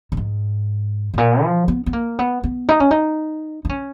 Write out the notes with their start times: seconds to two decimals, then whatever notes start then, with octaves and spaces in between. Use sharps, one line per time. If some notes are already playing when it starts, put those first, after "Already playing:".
0.12 A#2
0.17 G#2
1.14 G#2
1.18 A#2
1.43 F3
1.68 B3
1.86 B3
1.93 A#3
2.19 B3
2.43 B3
2.69 D#4
2.80 C#4
2.91 D#4
3.65 D#4
3.69 C#4